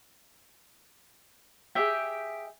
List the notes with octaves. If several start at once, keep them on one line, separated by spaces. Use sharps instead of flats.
G4 G#4 E5 G5